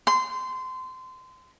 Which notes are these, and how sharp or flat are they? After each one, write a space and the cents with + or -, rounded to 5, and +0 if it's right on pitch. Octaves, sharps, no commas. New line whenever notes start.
C6 -25